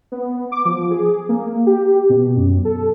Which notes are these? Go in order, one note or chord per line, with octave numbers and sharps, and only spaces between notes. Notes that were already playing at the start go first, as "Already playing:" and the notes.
B3
D6
F3
G#4
A#3
G4
B2
F#2
A4